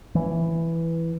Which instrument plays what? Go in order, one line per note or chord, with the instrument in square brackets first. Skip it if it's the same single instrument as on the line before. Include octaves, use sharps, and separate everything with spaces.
[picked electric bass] E3